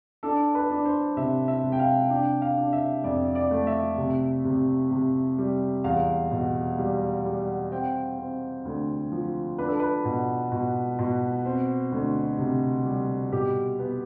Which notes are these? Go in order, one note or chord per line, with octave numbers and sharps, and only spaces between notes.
D4 A4
B4
D4
C5
C3 E5
E5
C3
G5
F5
D4 G5
F5
D4
E5
F2 D5
D5
A3
E5
C3
C3
C3
G3
E2 F5
B2
G3
G3
C4 G5
C4
D2
F3
D4 B4
A4
B4
B2
B2
B2
C4
D2
C3
G3
B2 G4
B3